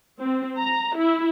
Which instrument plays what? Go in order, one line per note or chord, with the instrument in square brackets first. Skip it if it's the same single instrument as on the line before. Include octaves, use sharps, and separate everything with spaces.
[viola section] C4
A#5
E4